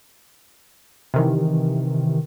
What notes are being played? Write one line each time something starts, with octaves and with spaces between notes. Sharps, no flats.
C3 D#3 E3